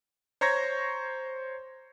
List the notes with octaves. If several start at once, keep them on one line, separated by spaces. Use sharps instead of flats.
C5 C#5 A#5 C#6 G#6 A#6